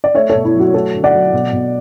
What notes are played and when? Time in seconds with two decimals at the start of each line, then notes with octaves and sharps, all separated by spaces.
0.04 D5
0.15 A3 C#5 E5
0.30 A4 C#5
0.35 B2
0.45 E4
0.54 F#3
0.59 F#4
0.74 A3 F#4 A4
0.94 D3
1.04 D5 F#5
1.14 F#3
1.33 B2
1.53 B2